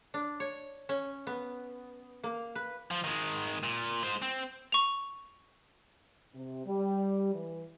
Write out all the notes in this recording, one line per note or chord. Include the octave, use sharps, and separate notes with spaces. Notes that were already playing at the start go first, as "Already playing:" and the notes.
D4
C#5
C#4
B3
A#3
B4
F3
D#3 G#3
A#2
G#3 C5
C4
C#6 F7
C3
G3
E3